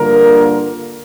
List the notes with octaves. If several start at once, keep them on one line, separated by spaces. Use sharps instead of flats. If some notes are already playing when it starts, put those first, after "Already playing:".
Already playing: G2 D3 A#3 F4 A#4